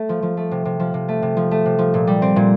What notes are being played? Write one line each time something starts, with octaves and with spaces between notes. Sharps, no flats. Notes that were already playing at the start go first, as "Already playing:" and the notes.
Already playing: A3
F3
F3
A3
C3
C3
F3
C3
A3
C3
F3
A3
C3
F3
A#2
G3
C4
A#2